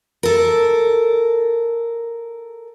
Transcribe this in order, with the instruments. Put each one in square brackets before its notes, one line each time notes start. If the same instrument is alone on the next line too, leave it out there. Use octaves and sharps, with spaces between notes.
[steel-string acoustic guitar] A4 A#4